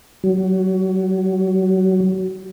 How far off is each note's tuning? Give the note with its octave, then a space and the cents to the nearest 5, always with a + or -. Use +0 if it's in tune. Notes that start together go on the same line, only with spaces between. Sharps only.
F#3 +25